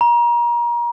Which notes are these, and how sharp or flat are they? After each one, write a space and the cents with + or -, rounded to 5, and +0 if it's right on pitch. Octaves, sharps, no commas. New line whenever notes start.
A#5 +30